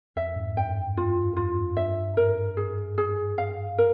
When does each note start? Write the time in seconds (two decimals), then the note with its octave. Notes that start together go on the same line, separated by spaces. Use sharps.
0.16 F2 E5
0.36 G#2
0.56 G2 G5
0.97 G2 F4
1.37 F2 F4
1.77 G2 E5
2.17 G#2 A#4
2.57 G#4
2.98 G#4
3.38 F5
3.78 A#4